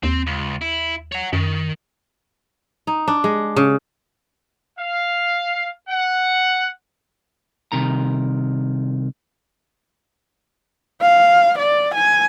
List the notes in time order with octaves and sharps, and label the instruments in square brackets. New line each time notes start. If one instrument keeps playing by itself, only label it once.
[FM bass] D#2 [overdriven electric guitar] C4
[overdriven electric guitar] C#2
E4
C#5 F#5
[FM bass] F#2 [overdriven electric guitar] D#3
[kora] D#4
D4
G#3
C#3
[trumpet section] F5
F#5
[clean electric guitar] C2 C3 D#3 A#5
[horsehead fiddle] F5
D5
G#5